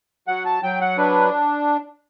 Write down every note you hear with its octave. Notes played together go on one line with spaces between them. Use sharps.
F#3 F#5
A5
F#3 G5
F#5
D4 B4